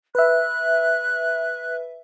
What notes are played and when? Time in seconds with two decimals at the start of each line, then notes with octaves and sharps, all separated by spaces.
0.15 B4 E5 F#6